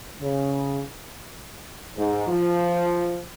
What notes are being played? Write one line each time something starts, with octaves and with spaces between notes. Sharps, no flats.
C#3
G#2
F3